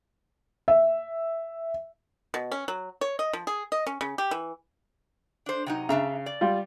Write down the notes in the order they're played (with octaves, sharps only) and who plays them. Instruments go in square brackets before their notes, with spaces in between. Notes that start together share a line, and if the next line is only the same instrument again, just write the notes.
[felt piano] E5
[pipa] B2
C#4
F#3
C#5
D#5
F3
G#4
D#5
C#4
C#3
G4
E3
[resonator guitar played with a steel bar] D4 C5
C3 F#3 D#4
[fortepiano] C#3 [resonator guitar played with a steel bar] D4 E5 A#5
[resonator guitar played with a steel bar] D5
[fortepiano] G3 F4